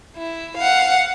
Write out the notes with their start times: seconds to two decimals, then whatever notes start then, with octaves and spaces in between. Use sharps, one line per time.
0.17 E4
0.57 F5 F#5